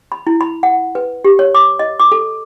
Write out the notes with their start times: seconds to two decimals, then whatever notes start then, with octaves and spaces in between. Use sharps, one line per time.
0.12 B5
0.27 E4
0.41 B5
0.63 F#5
0.95 B4
1.24 G4
1.39 C#5
1.55 D6
1.79 D#5
2.00 D6
2.12 A4